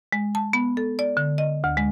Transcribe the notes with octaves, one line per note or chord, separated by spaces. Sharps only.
G#3
A5
B3
A4
D5
D3
D#5
D2
G#3